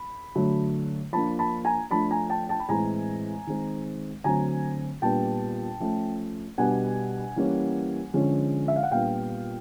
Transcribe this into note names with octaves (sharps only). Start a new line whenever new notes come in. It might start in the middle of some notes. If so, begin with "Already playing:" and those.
Already playing: B5
D3 F#3 A3
F3 A#3 D4 A5 B5
A5 B5
G#5 A#5
F3 A3 D4 A5 B5
G#5 A#5
G5 A5
G5 A5
B5
A2 E3 G#3 C4 G#5 A#5
D#3 G#3 C4
D3 F#3 A3 C4 G#5 A#5
A#2 G3 B3 D4 G5 A5
F3 A3 C#4
B2 G3 B3 D4 F#5 G#5
E3 G3 A#3 C#4
D3 F3 G#3 C#4
E5
F5
F#5
A#2 G3 B3 D4 F5 G5